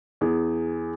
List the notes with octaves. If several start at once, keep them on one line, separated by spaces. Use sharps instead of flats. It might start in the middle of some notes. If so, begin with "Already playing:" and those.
E2 G#4